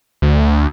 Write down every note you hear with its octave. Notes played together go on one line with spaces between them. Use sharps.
D2